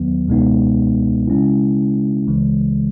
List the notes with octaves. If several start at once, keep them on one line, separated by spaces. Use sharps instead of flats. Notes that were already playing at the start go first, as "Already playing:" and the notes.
Already playing: D#2 D#3 F#3 B3
C#2 B2 G#3 B3 D#4
C#3 G#3 C#4 E4
C#2 C#3 E3 G#3